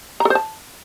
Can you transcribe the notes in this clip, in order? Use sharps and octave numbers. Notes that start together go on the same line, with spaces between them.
A#5
A4
C5
A5